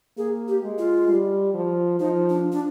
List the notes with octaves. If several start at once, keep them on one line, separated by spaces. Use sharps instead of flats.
A#3 G#4
G4
G#3
F4
G3
F3
F3 D#4
D4
D4